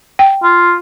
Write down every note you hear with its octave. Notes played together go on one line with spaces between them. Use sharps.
G5
F4